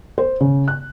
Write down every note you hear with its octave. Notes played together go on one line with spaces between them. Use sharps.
C5
C#3
F#6